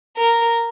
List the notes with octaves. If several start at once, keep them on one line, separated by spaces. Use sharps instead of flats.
A#4